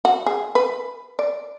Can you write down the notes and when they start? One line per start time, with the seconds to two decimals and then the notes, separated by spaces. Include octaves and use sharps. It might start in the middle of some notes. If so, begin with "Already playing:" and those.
0.05 F#4
0.26 G#4
0.55 B4
1.19 D5